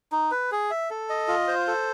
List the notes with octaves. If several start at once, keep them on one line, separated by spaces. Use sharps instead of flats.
D#4
B4
G#4
E5
A4
D#5
F4
C5
A4